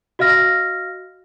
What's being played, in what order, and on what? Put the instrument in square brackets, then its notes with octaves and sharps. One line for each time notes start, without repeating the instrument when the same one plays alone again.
[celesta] F#4 D#5 F5 F6 A#6